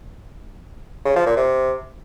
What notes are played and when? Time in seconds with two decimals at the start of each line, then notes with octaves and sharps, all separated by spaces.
1.05 C#3
1.16 F3
1.26 A#2
1.37 C3